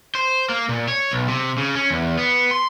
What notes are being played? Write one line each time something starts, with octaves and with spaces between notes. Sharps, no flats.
C5
A#3
A#2
C#5
B1
C3
C#3
C#4
E2
B3
C6